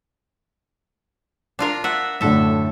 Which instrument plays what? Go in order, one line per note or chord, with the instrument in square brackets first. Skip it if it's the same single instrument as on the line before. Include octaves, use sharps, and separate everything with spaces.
[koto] D4 F4 A#4
E5 F#5
[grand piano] F#2 A2 D3 [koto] A4 E5